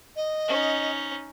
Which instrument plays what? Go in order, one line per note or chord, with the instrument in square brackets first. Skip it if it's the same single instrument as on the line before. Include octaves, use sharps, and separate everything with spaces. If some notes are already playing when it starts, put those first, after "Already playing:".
[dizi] D#5
[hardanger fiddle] C#4 D#4